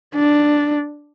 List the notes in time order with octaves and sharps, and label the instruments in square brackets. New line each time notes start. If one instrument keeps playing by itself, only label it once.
[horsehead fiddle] D4